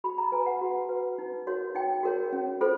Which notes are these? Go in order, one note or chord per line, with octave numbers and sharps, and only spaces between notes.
F#4 B5
A#5
B4 G#5
F#5
F#4
B4
D#4
F#4 A#4 C#5
D#4 G5
F#4 A#4 C#5
C#4
F4 A4 C5